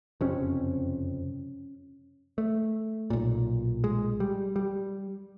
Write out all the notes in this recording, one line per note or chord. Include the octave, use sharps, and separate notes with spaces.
F#1 F2 C3 C#4
A3
B1 A#2
G#3
G3
G3